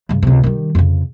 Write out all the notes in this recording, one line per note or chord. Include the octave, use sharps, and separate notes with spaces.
G2 C#3
C#2 C3
D#3 G3
F2 C#3